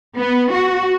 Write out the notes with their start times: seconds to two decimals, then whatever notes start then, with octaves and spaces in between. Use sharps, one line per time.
0.17 B3
0.52 F#4